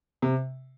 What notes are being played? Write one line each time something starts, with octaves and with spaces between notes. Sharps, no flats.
C3